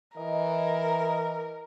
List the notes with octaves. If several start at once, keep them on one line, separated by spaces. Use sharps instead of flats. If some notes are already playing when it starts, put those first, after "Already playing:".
E3 A#4 D#5